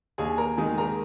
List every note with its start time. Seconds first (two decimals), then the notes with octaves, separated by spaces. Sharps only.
0.18 D#2 G#4 G#5
0.38 A#4 A#5
0.57 D#3 G#3 D#4 G#4 G#5
0.78 A#4 A#5